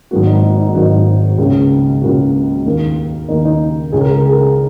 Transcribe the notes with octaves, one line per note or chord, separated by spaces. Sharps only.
G#1 G#2 F#3 A#3 F#4
D#4
D#4
D#4
G#1 G#2 F#3 A#3 F#4
D#4
F#4
C#2 C#3 A#3 C#4
C#2 C#3 A#3 C#4 F#4
D#2 D#3 A#3
D#2 D#3 A#3 D#4
D#4
C#2 C#3 G#3 C#4 G#4
A#4
G#4
A#4
G#4
A#4
G#4